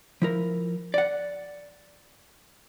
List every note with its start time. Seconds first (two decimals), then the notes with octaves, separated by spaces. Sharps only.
0.22 F3 E4 A#4
0.94 D5 F#5